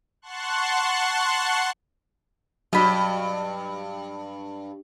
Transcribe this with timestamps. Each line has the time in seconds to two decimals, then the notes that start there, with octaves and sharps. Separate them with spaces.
0.22 F#5 A5 C6 C#6 F#6
2.73 G2 F#3 D#5 B5